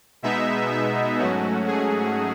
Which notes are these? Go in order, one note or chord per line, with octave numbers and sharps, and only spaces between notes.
B2 G#3 B3 D#4 E5
E5
G#2 F#3 A3 C#4 F#4
G#4